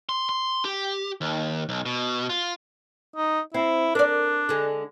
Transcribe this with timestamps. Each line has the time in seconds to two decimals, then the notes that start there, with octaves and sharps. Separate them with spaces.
0.09 C6
0.29 C6
0.65 G4
1.21 D#2
1.69 B1
1.86 B2
2.30 F4
3.16 D#4
3.54 C4 E4
3.95 D4 A#4 D5
4.49 D3 G#3